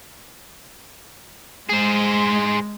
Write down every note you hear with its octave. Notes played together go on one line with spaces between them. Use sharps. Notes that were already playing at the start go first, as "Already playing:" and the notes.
G#3 G#4 C5